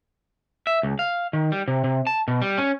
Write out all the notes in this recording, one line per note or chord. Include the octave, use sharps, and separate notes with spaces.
E5
C#2
F5
D#3
G3
C3
C3
A5
B2
G3
C#4